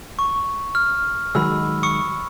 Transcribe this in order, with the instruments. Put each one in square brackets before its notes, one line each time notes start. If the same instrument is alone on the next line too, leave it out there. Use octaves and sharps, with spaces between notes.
[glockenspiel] C#6
F6
[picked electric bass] D#3 F#3 G#3 [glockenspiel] B5 E6
[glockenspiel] C#6 D#6 C#7